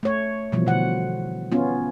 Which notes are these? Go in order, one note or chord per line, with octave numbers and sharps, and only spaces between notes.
A3 C#5
B2 E3 F3 G3
B2 D3 F#5
B3 C#4 F4